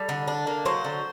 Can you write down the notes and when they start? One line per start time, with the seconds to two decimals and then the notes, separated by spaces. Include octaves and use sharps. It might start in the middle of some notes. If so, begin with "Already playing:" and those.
Already playing: G3 A4
0.09 D3
0.28 D4
0.47 A#3
0.65 F#3 C5
0.84 D3